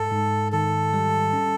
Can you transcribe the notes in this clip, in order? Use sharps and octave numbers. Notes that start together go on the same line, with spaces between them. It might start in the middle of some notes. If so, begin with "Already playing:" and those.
Already playing: G#2 A4
G#2
D#3 A4
G3
C#4